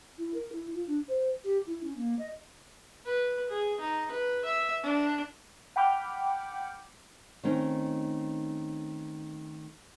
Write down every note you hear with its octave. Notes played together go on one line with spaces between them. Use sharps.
E4
A#4
E4
F4
D4
C5
G4
E4
C#4
A#3
D#5
B4
G#4
D#4
B4
E5
D4
F#5 G5 B5 D6 F6 G6
D#3 A3 C4 C#4 D#4